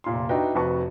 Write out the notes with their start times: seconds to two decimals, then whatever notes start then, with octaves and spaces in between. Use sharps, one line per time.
0.04 F1 A#2 C6
0.29 D4 D#4 F#4 B4 E5 G5
0.54 F1 F2 F#4 B4 A5 C#6